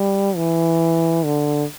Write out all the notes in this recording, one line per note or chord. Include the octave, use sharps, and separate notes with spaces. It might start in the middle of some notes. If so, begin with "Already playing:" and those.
Already playing: G3
E3
D3